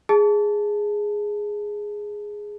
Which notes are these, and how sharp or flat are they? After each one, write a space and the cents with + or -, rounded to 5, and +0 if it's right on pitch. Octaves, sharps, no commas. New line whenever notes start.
G#4 +0 A5 +0